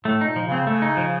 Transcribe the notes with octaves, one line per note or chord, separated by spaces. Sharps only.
A2 A3
A#2 D#4
F3
C#3
C4
C#3 A3
D#4
F3